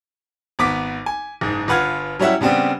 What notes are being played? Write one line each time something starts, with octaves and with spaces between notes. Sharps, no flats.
G#1 B3 D6 B6
G#5
F#1 G#2
G1 F4 B4 F#5 F6 G#6
F#3 G3 C#4 E4 E5 F#5
C#3 G3 B3 C4 D4